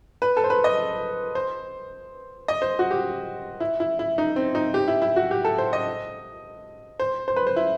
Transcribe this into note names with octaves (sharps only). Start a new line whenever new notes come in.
B4
A4
C5
B4
D#5
C5
D#5
C5
F#4
G4
E4
E4
E4
D#4
C4
D#4
G4
E4
E4
F#4
G4
A4
C5
D#5
C5
C5
B4
C5
E4